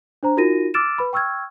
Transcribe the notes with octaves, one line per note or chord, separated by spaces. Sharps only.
D4 C5 A#5
D#4 F4 F#4 A#4 A#6 D#7
D6 E6 F6 A6 D7 E7
B4 B5
G5 C#6 E6 F6 G#6